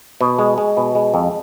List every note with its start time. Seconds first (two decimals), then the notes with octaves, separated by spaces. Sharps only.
0.21 B2
0.39 G#3
0.58 G#3
0.77 B2
0.95 G#3
1.14 F2